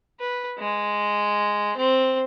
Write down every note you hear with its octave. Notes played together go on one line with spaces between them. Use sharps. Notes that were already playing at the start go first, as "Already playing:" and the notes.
B4
G#3
C4